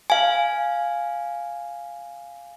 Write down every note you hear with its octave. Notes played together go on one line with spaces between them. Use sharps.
F5 G#5